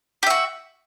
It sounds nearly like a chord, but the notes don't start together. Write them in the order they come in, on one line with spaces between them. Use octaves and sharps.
G4 E5 F#4